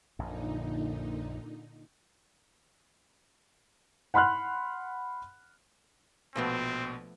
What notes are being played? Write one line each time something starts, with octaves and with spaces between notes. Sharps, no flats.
A#1 F#2 A#2 D3 D#4
F#5 B5 C6 F6 F#6
A#1 B2 F3 A3 B3 C4